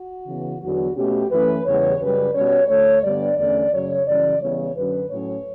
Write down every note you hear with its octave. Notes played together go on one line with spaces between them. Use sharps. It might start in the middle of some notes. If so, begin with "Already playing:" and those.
Already playing: F#4
C#3 E3 B3
E2 D3 F#3 B3 F#4
B2 A3 C#4 G4
F#2 E3 A3 C#4 B4
E2 C#3 E3 G3 B3 C#5
F#2 C#3 G3 B4
B2 G3 C#4 C#5
D2 D3 A3 C#5
G2 D3 G3 B3 D5
E2 D3 A3 C#4 D5
F#2 C#3 F#3 C#5
F#2 C#3 E3 G3 C#4 D5
C#3 E3 G3 B3 C#5
F#2 D3 F#3 C#4 B4
A2 F#3 C#4 C#5